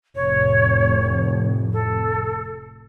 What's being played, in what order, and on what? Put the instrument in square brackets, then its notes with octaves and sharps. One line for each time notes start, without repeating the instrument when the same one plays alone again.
[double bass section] F1 A2 [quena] C#5
[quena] A4